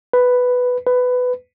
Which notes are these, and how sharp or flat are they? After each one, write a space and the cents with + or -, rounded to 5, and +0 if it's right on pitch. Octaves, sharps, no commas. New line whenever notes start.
B4 +5
B4 +15